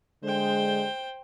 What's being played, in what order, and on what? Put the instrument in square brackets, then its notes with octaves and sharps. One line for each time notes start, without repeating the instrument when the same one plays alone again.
[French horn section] D3 G#3 [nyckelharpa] C5 G5